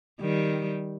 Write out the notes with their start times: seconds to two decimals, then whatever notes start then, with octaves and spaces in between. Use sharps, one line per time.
0.20 D#3 G3